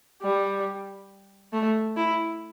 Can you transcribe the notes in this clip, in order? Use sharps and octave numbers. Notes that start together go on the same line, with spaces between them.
G3
A3
E4